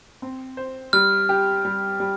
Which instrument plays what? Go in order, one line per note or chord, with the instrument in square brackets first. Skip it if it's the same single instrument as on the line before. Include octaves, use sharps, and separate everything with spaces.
[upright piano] C4
C5
[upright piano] G3 [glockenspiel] F6
[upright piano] G4
G3
G3